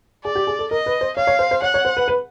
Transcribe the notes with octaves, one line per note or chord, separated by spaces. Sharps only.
G#4 D5
G4
G#4
A4
A#4 D#5
B4
C5
C#5 F5
C#5
C5
C5
C#5 F#5
C#5
C5
B4
B4